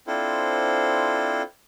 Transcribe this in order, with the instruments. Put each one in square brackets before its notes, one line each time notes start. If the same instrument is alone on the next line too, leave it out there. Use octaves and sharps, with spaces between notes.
[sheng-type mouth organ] C4 D4 E4 F4 A4 C5